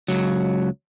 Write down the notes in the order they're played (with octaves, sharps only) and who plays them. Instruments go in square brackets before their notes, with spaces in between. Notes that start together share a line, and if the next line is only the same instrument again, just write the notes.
[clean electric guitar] C#2 F#3